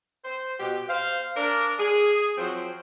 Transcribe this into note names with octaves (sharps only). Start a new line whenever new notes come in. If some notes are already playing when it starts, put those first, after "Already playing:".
C5
B2 G4
C5 F5
D4 A#4
G#4
F3 F#3 C4 F#4 C5